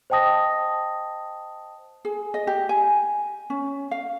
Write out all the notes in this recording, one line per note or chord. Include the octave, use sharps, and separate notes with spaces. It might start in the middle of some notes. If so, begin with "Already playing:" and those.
C5 D#5 G5 A5 D#6 A#6
G#4
D#5
G4
G#5
C#4
F5